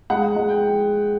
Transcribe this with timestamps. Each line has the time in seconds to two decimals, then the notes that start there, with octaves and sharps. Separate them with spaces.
0.10 G#3 F#5
0.36 G#3
0.49 G5